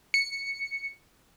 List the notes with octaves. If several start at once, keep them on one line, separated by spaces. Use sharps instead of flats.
C#7